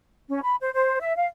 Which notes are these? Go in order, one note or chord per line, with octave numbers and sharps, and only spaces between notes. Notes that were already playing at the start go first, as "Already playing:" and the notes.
C#4
B5
C5
C5
E5
F5